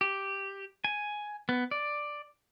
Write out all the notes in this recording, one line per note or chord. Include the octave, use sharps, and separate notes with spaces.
G4
G#5
B3
D5